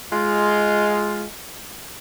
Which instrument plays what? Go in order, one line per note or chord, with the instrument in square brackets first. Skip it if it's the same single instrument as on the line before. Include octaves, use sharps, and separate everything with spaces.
[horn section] G#3 F4